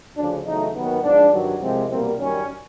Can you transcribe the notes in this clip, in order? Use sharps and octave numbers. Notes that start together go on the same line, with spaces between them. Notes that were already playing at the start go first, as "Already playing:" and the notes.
D2 C#3 F3 D4
E2 C#3 F#3 A3 D#4
D#2 D#3 F#3 B3
G#2 F3 G#3 D4
G2 D#3 F#3
C2 C3 F3 G#3 C4
C2 B2 G3 A#3 C4
F#2 D#3 G3 C#4